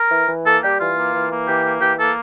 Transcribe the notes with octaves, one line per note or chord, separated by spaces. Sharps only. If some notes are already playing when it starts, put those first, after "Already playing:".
Already playing: A#4
E3
E3
A#3 A4
G3 G4
E3 F4
A#3
E3
A#3
E3 G4
A#3
E3 G4
A#3 A4